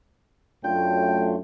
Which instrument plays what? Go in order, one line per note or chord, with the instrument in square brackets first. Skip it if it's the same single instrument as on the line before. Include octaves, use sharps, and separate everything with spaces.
[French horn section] F#2 A3 [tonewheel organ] D4 F4 [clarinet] G5